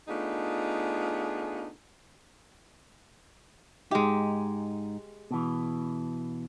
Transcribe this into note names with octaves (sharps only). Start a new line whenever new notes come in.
A3 B3 D4 D#4 F4 G#4
G#2 G#3 D#4 G4
B2 E3